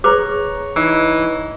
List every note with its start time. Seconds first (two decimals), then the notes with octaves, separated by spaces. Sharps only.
0.04 G#4 B4 C#5 A#5 D6 F#6
0.76 E3 D#4 D#5